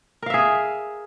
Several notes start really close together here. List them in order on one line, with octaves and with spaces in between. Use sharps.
A#4 F5 E5 G#4